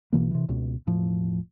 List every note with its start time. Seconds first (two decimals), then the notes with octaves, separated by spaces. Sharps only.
0.13 A#1 B2 E3 A#3
0.31 C3 E3
0.49 C#2 B2
0.87 E1 A2 F3